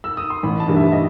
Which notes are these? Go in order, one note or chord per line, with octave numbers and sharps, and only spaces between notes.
E6
D#6
C6
A1 B5
A5
G2 E3 G3
E5
D#5